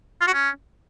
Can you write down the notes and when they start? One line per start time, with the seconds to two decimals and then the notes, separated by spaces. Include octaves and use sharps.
0.21 F4
0.27 F#4
0.33 C#4